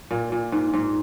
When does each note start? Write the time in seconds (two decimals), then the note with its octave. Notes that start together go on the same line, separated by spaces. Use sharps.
0.11 A#2
0.32 A#2
0.52 G#2
0.74 G#2